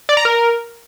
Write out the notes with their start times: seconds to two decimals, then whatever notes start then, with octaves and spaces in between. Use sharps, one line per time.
0.09 D5
0.17 A#5
0.25 A#4